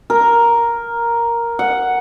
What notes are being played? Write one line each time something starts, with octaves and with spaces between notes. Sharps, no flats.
A#4
F#5